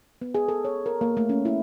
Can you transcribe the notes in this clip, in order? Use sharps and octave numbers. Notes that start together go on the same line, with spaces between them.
B3
G#4
A4
C#5
A#4
A#3
A3
C#4
E4